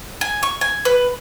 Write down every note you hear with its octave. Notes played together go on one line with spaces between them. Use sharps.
G#5
C#6
G#5
B4